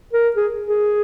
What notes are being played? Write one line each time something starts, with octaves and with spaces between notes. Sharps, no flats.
A#4
G#4
G#4